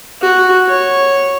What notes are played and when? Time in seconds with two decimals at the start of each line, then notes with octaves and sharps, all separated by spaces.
0.22 F#4
0.68 C#5